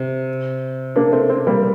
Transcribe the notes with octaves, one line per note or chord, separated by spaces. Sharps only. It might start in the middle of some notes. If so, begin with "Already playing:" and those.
Already playing: C3
A#3 D4
A3 C4
A3 C4
G3 A#3